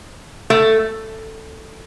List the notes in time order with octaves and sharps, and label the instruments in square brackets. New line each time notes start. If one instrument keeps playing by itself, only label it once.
[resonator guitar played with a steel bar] A3